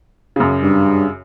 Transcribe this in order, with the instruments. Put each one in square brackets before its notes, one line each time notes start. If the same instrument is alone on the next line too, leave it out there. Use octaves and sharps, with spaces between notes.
[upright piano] F#2 C#3
[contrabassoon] G2